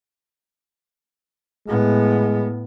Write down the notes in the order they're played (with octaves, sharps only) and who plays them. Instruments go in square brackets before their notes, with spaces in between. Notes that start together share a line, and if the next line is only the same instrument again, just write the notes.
[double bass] A2 B3 [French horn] G#3